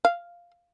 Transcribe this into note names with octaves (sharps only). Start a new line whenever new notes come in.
F5